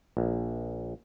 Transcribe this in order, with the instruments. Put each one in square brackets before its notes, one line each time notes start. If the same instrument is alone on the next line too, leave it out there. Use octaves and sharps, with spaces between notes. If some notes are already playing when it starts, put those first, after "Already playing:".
[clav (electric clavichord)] A#1